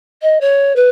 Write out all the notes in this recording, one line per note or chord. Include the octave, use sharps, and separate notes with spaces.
D#5
C#5
B4